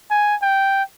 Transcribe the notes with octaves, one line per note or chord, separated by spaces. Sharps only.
G#5
G5